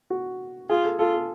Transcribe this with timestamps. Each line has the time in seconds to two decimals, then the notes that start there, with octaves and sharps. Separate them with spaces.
0.10 F#4
0.69 F4 G#4
0.85 A4
0.99 F4 A4
1.14 A4